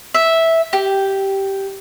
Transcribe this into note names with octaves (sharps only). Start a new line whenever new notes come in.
E5
G4